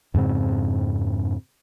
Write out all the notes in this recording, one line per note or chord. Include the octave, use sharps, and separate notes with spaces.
F2 G#2 C#3 C4